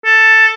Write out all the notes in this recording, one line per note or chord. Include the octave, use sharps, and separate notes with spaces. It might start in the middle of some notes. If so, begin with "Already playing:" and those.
A4